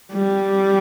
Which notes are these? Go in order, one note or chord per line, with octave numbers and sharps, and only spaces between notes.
G3